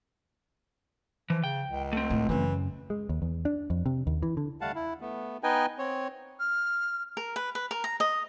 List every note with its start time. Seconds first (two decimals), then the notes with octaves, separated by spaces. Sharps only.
1.30 E3 F3
1.44 C#3 G5
1.68 C#2
1.93 A3 C4
2.10 A2
2.29 F#2 C#3 E3
2.90 G#3
3.09 D#2
3.22 E2
3.45 D4
3.70 F2
3.86 C3
4.07 D#2
4.23 E3
4.37 D3
4.61 G3 A3 F5 F#5 A5
4.75 E4
5.01 A3 B3
5.43 B3 D#4 B4 D#5 G5 G#5
5.79 C4 C#5
6.40 F6
7.17 A#4
7.36 B4
7.55 B4
7.71 A#4
7.84 A#5
8.00 D#5